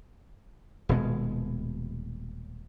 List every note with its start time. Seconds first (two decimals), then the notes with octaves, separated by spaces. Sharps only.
0.89 D#1 B2 G#3